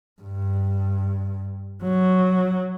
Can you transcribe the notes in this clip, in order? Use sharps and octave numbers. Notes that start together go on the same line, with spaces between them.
G2
F#3